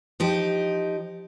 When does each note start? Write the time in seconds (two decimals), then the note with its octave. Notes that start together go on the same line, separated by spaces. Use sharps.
0.20 F3 D#4 G4